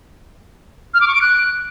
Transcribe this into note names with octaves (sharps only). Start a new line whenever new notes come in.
F6
D6
C#6
D7
F#6